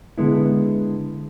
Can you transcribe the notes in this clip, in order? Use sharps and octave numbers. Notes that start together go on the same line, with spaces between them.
D3 G#3 B3 E4